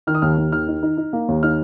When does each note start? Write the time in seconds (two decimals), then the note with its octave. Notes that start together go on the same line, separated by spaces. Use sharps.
0.07 D#3 F6
0.15 D#6
0.22 D#2 F6
0.37 D#2
0.52 D#3 F6
0.68 D#4
0.83 D#4
0.98 D#4
1.13 A#3
1.28 D#2
1.43 D#4 F6